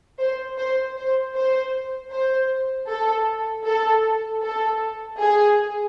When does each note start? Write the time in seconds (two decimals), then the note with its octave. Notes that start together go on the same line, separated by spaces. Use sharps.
0.20 C5
0.58 C5
0.96 C5
1.35 C5
2.12 C5
2.89 A4
3.65 A4
4.42 A4
5.20 G#4